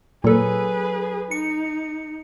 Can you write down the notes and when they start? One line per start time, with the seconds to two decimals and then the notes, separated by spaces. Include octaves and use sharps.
0.24 A#2 F#3 G#4 A4 B4
1.31 D#4 C#7